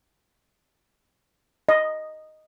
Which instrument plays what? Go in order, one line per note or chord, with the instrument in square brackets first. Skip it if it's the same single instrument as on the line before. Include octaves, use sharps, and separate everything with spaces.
[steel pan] D#5